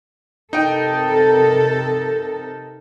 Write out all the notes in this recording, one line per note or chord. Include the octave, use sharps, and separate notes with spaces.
C3 D#4 A4 A#4 G5